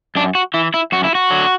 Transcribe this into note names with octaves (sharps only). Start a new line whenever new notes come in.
F#2 D4
F#4
E3 E4
E4
F#2 F#4
E4
F#4
D3 F#3